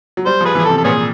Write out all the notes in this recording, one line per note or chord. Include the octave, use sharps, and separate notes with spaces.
F#3
G3 C5
F3 G#4 B4
E3 G#4
A4
C3
A4
A#2 B3 C#4 G#4